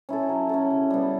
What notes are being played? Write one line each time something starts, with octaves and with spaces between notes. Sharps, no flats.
C#4 E4 A4
F#3
C#4 E4 A4
C#3
G3 B3